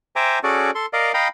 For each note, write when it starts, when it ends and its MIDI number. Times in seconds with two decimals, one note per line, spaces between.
0.16 0.39 72
0.16 0.39 76
0.16 0.39 79
0.16 0.39 80
0.16 0.39 82
0.16 0.39 86
0.43 0.71 61
0.43 0.71 66
0.43 0.71 68
0.43 0.71 69
0.43 0.71 74
0.75 0.86 69
0.75 0.86 84
0.93 1.12 70
0.93 1.12 74
0.93 1.12 75
0.93 1.12 77
1.14 1.28 75
1.14 1.28 77
1.14 1.28 79
1.14 1.28 82
1.14 1.28 83